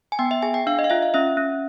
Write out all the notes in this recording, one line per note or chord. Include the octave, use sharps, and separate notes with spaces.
G#5
B3 G5
E5
G#4 G#5
G5
D4 F5
D#5
F5
F4 E5
F5
C#4 E5
C#4